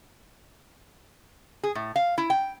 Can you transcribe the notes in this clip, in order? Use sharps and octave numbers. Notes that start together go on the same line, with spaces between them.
G#4
A2
F5
E4
G5